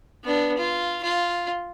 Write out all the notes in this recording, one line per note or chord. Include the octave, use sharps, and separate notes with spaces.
B3 D4
F4
F4